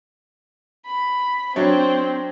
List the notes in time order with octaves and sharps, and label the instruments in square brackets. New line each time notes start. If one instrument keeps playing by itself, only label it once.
[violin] B5
[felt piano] F#3 D4 C#5 [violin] C4